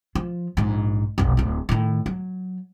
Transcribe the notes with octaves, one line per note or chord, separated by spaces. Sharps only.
F3
A#1 G#2
F1 B1
D1 D2
A2 D#3
F#3